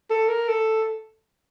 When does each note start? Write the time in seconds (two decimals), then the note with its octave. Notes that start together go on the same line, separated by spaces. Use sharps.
0.10 A4
0.29 A#4
0.49 A4